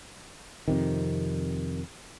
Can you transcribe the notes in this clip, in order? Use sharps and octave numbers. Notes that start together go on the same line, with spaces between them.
F2 C3 D#3